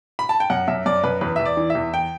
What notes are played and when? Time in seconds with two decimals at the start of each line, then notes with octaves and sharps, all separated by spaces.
0.19 B5
0.29 A5
0.40 G5
0.50 F#2 F#5
0.68 F#2 E5
0.86 F#2 D5
1.04 F#2 B4
1.21 E2 B4
1.36 E2 E5
1.45 D5
1.57 E3
1.70 E5
1.75 E2
1.94 G5